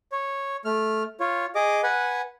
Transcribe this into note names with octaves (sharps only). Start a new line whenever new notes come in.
C#5
A3 F6
F4 C#5
G#4 D#5 D6
B4 F#5 G#5